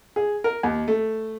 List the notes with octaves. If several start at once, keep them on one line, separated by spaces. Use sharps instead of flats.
G#4
A#4
D#2
A3